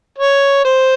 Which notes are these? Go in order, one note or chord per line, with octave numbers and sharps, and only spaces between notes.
C#5
C5